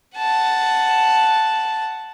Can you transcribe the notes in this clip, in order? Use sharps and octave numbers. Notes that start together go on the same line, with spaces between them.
F#5 A5